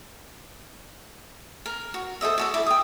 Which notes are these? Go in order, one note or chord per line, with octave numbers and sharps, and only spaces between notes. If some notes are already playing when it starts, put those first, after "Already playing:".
A#4
F#4
A4 C5 D#5 E5
F#4 A4 D5
E4 D6
G5 D#6